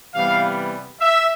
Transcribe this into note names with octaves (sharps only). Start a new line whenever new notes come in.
C3 E3 G3 B3 F5
E5